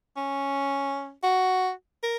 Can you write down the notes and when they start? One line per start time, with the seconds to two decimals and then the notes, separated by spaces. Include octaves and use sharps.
0.17 C#4
1.23 F#4
2.03 A#4